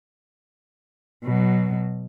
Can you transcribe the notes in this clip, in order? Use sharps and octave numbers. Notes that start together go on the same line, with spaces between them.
B2 F#3